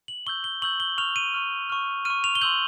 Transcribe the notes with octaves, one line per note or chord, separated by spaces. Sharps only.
F#7
C#6 E6 G6 G7
G7
C#6 E6 G6 F#7
G7
C#6 F6 F7
D#7
C#6 F6
C#6 F6
C#6 F6 D#7
F7
G7
C6 E6 G6 F#7